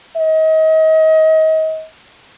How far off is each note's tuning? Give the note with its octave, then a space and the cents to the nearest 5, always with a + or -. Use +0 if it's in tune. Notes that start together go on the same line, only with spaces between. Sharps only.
D#5 +30